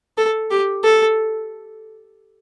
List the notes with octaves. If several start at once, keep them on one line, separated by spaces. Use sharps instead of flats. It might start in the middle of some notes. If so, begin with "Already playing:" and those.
A4
G4
A4